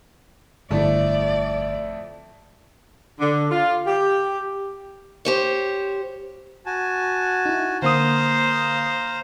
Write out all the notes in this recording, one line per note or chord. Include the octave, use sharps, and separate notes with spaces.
G1 F2 A3 E4 D5
D3
F4
G4
G4 C5 C#5
F#4 G#5 A5
D#4 E4
D3 A#3 C5 F5 A#5 D#6